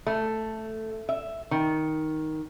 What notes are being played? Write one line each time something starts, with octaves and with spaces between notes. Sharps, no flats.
A3
E5
D#3